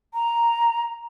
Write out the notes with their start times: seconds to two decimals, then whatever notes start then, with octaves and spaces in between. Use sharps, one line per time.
0.14 A#5